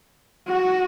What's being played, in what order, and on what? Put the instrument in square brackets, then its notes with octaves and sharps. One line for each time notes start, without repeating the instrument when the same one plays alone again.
[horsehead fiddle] F#4